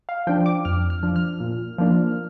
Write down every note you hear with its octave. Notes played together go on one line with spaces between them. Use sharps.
F5
F3 D4 G5
D6
F2 F6
F6
F3 D4
F6
A#2
F3 A#3 D4